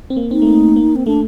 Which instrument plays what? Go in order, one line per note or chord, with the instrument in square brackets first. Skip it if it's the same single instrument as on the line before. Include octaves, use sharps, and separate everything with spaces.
[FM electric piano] C4
A#3
[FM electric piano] C4 [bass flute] D#4
[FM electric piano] A3
A#3
A#3
[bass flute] C4
[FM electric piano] A3 [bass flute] D4